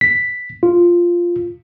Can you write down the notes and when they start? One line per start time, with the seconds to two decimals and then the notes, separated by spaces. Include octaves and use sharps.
0.01 B6
0.63 F4